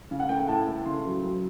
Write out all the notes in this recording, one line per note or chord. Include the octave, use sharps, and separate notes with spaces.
C#3
F#5
A3 G5
A2 A5
A3
C#3 C6
F#3
F#3